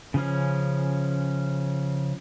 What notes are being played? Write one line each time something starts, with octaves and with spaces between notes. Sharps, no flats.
C#3 F3 C#4